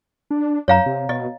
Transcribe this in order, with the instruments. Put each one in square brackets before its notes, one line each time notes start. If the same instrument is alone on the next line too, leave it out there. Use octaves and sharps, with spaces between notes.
[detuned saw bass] D4
[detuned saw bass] F#2 [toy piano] C#5 F5 A#5
[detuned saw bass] C3
[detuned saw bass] B2 [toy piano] D#5